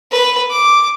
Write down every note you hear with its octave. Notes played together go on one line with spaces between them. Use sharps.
B4
D6